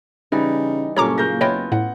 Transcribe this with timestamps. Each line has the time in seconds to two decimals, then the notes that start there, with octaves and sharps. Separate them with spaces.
0.32 C#3 E3 G3 D#4
0.96 F#1 G2 A#2 C#4 A4 C#5 A#5 D6
1.18 C#3 A#3 G6 A#6
1.41 B3 E4 F4 C#5 D#5 G5
1.72 A2 F#5